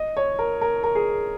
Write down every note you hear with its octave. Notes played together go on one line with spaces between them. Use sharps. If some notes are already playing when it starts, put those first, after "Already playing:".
Already playing: D#5
C#5
A#4
A#4
A#4
G#4